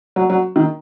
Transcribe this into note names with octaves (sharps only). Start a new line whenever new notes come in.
F#3
F#3
D#3